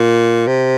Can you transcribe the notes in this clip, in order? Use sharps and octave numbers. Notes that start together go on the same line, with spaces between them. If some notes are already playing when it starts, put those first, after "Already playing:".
Already playing: A#2
C3